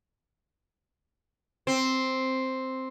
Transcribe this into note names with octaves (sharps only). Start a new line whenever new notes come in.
C4